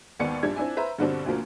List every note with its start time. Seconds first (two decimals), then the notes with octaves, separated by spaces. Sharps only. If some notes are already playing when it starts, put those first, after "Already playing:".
0.20 G#1 D#2 B3 D5 C#7
0.43 A#1 G2 D4 G4 G#6
0.56 C4 D4 E4 G#5
0.77 B4 C5 E5 A#5
0.99 G2 B2 D3 G3 C4 D4
1.26 D2 B2 D3 F3 A#3